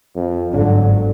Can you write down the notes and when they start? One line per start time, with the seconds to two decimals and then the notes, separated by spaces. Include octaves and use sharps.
0.16 F2
0.53 G1 G#2 D3 F#3